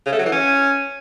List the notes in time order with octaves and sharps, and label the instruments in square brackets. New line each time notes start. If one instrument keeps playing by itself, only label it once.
[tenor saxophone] C#3
A3
F#3
E3
C#4